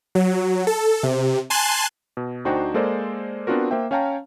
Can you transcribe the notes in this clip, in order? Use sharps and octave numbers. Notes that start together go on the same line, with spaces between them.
F#3
A4
C3
G#5 A5 C6 F#6
B2
D2 D4 D#4 F#4 C5 G5
G#3 A#3 A4 A#4 C5 D5
B3 C4 D4 F4 F#4 A#4
A#3 C5 E5 G5
C#4 C#5 F5 G5 A5 A#5